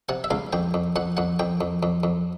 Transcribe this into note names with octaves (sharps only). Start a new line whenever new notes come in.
C3 F#5
E5
C#2 F5
F2 G5
F2
F2 F#5
F2 F#5
F2 G5
F2
F2
F2